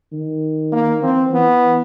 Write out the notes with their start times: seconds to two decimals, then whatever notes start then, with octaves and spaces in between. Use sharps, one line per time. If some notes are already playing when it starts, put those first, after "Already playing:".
0.13 D#3
0.73 A#3
1.03 E3 C4
1.33 E3 B3